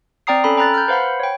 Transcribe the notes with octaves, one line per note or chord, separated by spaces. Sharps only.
C4 D5 G5 A#5 D#6 C7
C#4 A4 B5
G5 A#5 B5 F#6 A6
F6 G6
B4 C5 F5 F#5 B5
C#5 G5